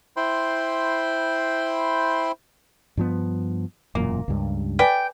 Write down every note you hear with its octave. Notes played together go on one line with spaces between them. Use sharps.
E4 C5 G5 B5 C6
G2 F3 B3
E1 F#2 A#2 A#3
C#2 G2
B4 D5 G5 G#5